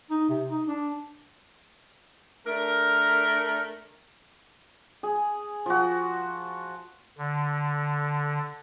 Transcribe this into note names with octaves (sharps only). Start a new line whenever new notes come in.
D#4
C3
D#4
D4
A3 D4 A#4
G#4
F3 F#4
D3